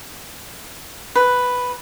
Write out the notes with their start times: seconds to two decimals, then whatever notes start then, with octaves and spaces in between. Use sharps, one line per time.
1.15 B4